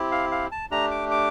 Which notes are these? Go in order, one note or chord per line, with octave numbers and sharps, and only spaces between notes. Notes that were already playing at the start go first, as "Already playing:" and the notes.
Already playing: C4 E4 G4
F5
F5
A5
A3 D4 G4 A#5
D6
D6